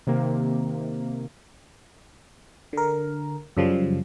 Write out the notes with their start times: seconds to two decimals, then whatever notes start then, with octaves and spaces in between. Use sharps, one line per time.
0.07 C3 D#3 A#3
2.73 D3 A#4
3.57 F#2 C#3 F3 G3